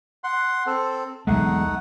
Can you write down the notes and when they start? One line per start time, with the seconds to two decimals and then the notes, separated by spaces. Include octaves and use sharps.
0.24 F#5 C6
0.66 C4 A4
1.27 E1 B1 G#3 A3 D#4 F#5